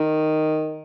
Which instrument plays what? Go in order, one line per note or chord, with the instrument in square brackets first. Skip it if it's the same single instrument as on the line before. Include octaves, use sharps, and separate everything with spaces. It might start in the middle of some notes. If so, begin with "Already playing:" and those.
Already playing: [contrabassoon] D#3